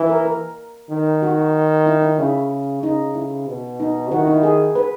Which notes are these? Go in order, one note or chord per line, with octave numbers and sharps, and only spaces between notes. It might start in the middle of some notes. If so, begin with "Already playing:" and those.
Already playing: E3
A#4
A#4
D#3
F#4
E4
E4
C#3 E4
C#3 D#4
E4
B2
D#4
D#3 F#4
E4
D#4
E4
G#4
B4